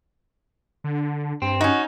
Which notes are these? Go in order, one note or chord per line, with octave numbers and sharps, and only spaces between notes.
D3
G2 C4
C#4 D#4 F#4